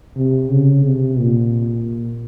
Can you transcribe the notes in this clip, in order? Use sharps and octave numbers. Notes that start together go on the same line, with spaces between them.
C3
C#3
C3
A#2